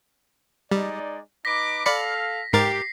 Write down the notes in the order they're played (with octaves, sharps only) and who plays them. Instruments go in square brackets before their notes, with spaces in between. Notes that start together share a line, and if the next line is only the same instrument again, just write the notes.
[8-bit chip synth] G3 [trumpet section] G#3 D#4 D5
[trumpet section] D#4 B4 D6 [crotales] A#6 B6
[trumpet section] A4 F5 [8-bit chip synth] D5 B5 C#7
[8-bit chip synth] G#2 A#4 A6 [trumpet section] G4 [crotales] C7